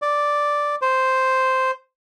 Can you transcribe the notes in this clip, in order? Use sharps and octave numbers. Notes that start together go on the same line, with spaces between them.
D5
C5